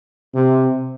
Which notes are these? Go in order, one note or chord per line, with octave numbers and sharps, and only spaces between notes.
C3